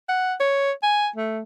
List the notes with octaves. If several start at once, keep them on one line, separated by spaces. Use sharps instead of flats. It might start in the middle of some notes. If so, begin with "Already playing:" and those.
F#5
C#5
G#5
A3